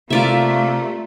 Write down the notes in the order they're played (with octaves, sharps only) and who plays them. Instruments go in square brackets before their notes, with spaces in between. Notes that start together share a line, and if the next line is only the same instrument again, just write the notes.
[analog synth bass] C3 [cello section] A3 [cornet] A#3 [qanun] F4 D5 E5